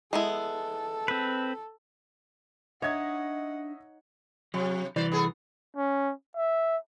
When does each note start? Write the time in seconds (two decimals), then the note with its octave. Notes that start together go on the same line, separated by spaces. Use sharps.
0.13 G#3 B3 E4 A4
1.08 C4 B4
2.82 D4 D#4 C#5 D#5 E5 F#5 G#6
4.54 C3 F#3
4.96 C2 E3 F#4 C5 D5
5.12 B3 G#4 A4
5.77 C#4
6.37 E5